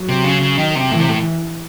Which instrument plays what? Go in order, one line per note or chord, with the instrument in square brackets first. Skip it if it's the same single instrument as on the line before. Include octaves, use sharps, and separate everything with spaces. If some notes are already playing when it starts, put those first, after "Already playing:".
Already playing: [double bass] F#3
[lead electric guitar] C3
C#3
C#3
D#3
C3
[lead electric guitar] A2 [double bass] E3
[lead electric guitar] C3
A2